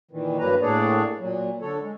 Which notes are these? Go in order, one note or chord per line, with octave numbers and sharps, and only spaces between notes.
A#2 D#3 E3
G2 F#3 A#3 B4 A#5
A2 A#3 D4 G#4 C#5 D5
A#2 F#3
D3 A4 C#5
G#3